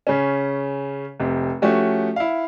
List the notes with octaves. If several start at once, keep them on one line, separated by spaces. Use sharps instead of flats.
C#3 C#4
F1 C3 C4
F3 A3 C#4 F#4 G4
E4 F5